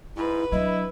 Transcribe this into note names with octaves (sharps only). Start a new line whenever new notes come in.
G#2 E4 B4
F#3 D4 E4 D#5